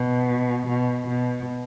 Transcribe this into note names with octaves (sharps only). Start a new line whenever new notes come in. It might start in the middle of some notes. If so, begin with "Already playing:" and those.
Already playing: B2
B2
B2